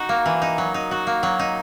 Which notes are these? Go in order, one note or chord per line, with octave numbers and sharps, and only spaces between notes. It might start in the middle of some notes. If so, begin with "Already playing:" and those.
Already playing: D#4 F#4
A#3
E3
D#4
F#3
D#4
F#4
A#3
F#3
D#4